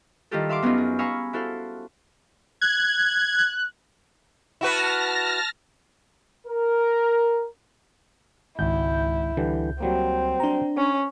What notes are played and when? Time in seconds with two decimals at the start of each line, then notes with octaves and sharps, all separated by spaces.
0.31 D#3 G3 E4 F4 G4 A4
0.49 E5 F5 C6 D6
0.62 F#2 B3 C#4 D#4 F4
0.78 G#4
0.99 F5 G#5 A#5 B5 C#6 E6
1.33 E4 F#4 A4 C5 F5
2.61 F#6 G#6
4.61 E4 F#4 B4 A5 F6 A#6
6.47 A#4
8.59 G#1 C#2 E4 G6
9.37 D3 E3 G3
9.80 F#3 G3 A#3 C4
10.40 D4 A#5
10.77 C#4